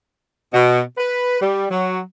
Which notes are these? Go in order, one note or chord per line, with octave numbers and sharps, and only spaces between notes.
B2
B4
G3
F#3